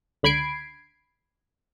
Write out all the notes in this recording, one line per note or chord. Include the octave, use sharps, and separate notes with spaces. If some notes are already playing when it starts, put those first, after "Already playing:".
C#2 D3 B5 G#6 C7 D7